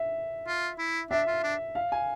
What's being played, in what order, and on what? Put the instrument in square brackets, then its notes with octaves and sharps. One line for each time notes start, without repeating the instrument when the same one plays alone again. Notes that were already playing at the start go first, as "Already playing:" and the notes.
Already playing: [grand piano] E5
[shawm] F4
E4
[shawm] D4 [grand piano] E5
[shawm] F4
D4
[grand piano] F5
G#5